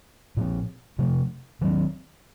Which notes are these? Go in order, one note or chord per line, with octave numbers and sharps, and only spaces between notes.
A#2 F3 C4
C3 F3 A3
D#3 F#3 A3 C4